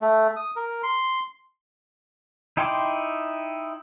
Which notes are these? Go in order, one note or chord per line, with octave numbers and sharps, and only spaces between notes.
A3
D#6
A#4
C6
D#4 E4 G5 C6 D6